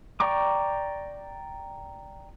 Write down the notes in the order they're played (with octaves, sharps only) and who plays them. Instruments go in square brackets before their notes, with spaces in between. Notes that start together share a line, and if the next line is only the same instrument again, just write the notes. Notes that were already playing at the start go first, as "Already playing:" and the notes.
[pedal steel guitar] D5 G5 A#5 C#6 D6